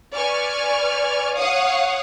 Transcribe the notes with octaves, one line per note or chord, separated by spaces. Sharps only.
B4 D5 G#5 C#6 F6
C#5 F5 F#5 C#6 D#6